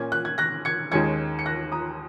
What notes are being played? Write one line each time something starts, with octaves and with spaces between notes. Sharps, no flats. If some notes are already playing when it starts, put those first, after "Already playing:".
Already playing: A#2 A#3 C#4 G#6
F#6
G#6
F#6 A#6
G#6 C#7
D#2 D#3 G#3 C#4 G#6 C#7
C#7
F#6 A#6
A#5 D#6